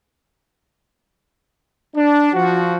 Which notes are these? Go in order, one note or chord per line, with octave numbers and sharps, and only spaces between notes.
D4
F3 F#4